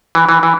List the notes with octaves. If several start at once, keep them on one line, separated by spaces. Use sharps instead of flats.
E3
E3
E3